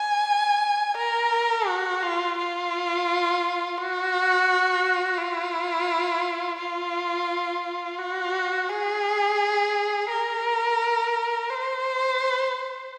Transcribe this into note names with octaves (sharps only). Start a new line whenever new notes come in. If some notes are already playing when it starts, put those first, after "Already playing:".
Already playing: G#5
A#4
F#4
F4
F4
F#4
F4
F4
F#4
G#4
A#4
C5